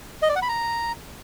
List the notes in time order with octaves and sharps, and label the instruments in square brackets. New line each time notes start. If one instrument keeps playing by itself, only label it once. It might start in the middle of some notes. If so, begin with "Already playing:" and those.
[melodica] D#5
D5
F#5
B5
A#5